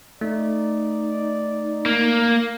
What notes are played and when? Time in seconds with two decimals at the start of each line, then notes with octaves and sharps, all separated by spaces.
0.21 A3 D#4 D5
1.86 A#3